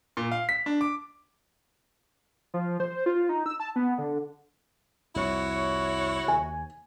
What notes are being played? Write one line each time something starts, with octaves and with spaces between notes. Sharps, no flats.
A#2
F5
B6
D4
D6
F3
C5
F4
D#4
E6
A5
B3
D3
C2 F2 C3 E4 F#4 C#5
D#2 G#5